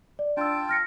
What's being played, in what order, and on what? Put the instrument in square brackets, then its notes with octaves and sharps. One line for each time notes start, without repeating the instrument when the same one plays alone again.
[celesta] D5
[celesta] D4 E6 [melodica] F4 G5 A5
[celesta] F6 A#6 C#7